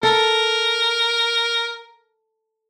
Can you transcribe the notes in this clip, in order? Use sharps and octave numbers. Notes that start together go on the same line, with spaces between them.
A4 A#4